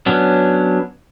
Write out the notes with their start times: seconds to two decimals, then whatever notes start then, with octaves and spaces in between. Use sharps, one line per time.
0.06 F#3 B3 C#4 D4